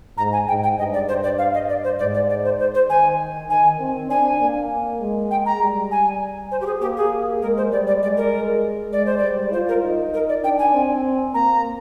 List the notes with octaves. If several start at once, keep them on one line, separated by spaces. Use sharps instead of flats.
G#2 A#5
G#5
G#2 G5
G5
G2 D#5
D5
C5
D5
F5
D#5
D5
C5
G#2 D5
D5
D5
C5
C5
C5
D#3 G#5
D#3 G#5
C4
D4 G#5
A#3
G#3
G5
A#5
G3
G#5
C5
G4
G#4
A#3 G4
G#4
G#3 A#4
C5
G3 D5
D5
G#3 D5
A#4
G#3 D5
C5
D5
G3
F4 C5
A#4
D#4
A#4
D5
D4 G5
G#5
C4
A#3 A#5